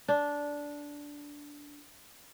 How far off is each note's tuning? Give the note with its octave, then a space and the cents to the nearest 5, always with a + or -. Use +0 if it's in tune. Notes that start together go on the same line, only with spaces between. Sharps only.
D4 -10